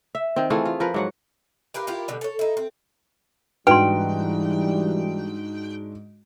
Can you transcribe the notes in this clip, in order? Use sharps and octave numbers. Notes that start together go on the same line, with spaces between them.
E5
D#3 C4
E3 A3 F4 G#4
F4
F3 A#4 B4
G#2 F#3 F#5
G4 A#4 B4 F5
E4 F4 G4 A#4
B2 D3 G3
A4 C#5
D#4 E4
C4
G#2 E3 G3 D4 F#4 B4 G5 C6